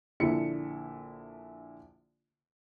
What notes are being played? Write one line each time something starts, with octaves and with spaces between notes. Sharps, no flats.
A#1 D3 E4 C#7